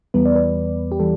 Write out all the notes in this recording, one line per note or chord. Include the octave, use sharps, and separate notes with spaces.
E2 E3 G3 B3 B4
D5
B4
G4
E3 G3 A4